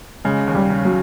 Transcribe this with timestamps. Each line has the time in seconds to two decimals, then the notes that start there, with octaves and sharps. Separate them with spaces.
0.25 C#3 G#3
0.47 D#2
0.55 G3
0.70 C#3
0.85 F#3